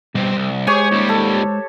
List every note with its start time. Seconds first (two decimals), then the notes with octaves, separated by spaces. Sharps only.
0.15 B2 G3 C4
0.35 C2
0.67 G#3 G4 G#4 C5 C#5 G#5 C#6
0.91 D#2 G3
1.09 A4